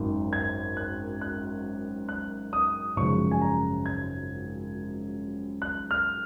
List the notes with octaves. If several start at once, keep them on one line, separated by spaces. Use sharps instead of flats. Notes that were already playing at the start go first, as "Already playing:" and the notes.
Already playing: G#1 F#2 D#3
G#6
F#6
F#6
F#6
D#6
G#1 F#2 C#3 F3 C#6
G#5
A#5
G#6
F#6
F6